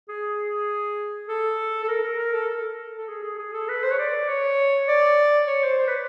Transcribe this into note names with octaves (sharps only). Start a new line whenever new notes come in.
G#4
A4
A4
A#4
A#4
A#4
A4
A4
G#4
G#4
G#4
A4
B4
C5
C#5
D5
C#5
D5
C#5
C5
C5
B4